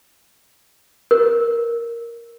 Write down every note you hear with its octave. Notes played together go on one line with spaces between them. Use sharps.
A#4